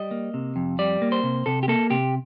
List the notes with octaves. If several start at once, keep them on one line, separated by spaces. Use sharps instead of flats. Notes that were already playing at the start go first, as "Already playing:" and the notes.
Already playing: G3 D#5
A#3
C3
F2
G3 D5
A#3
C5
C3
C3 A4
G4
A#3 A4
C3 G4